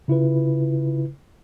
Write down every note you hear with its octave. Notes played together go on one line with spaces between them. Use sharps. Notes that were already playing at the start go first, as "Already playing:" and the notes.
C#3 E4 F4 B4